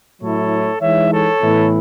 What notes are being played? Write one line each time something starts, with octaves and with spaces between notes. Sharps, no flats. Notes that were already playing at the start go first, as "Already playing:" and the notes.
A2 F#3 A3 E4 A4 C#5
E3 G#3 D#4 C#5 E5
A4 C#5
A2 E3 B3 E4